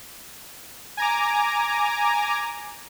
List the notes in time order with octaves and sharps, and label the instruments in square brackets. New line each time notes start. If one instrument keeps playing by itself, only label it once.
[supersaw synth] G#5 A#5 D6